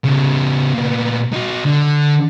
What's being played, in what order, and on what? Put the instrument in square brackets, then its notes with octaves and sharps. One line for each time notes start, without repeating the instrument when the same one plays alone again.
[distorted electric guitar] C#3 B3
A#2 B3
D#4 F#4
D3